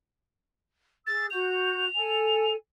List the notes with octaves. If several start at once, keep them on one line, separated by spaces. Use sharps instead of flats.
G#4 E6 A6
F#4 G6 F7
A4 G#5